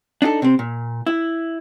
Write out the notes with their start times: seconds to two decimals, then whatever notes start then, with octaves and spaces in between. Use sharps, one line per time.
0.22 D4 D#4 G4 A4
0.42 C3 C4
0.59 A#2
1.07 E4